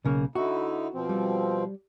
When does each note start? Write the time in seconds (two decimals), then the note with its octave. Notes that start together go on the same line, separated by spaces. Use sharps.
0.04 B1 C#3 A#3
0.35 D3 D#4 E4 F#4
0.94 B2 F3 C4
1.09 G3